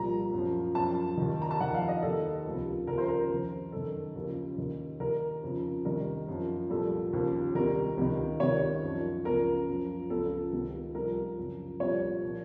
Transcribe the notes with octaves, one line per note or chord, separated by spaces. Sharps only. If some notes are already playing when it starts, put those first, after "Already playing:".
Already playing: C2 A#2 F3 A#5
F#2 F3
F#2 F3 A5
D#2 D#3
A#5
A5
F2 D#3 F#5
F5
D#5
D#2 D#3 A4
C#2 C3 F3
D#2 C#3 F3 A#4
C5
A#4
F2 D#3
F#2 D#3 A4
D#2 C#3 F3
D#2 D#3
D#2 D#3 A#4
F2 C#3 F3
C2 C3 D#3 A#4
F#2 F3
C2 A#2 F3 A4
D#2 C#3 F3
C2 C3 D#3 A#4
C#2 C3 D#3
C#2 C3 D#3 C#5
F#2 F3
C#2 C#3 F3 A#4
F#2 F3
C#2 C#3 F3 A4
C#2 C3 D#3
C2 C3 F3 A#4
F#2 C#3 F3
C2 A#2 F3 C#5
A#2 F3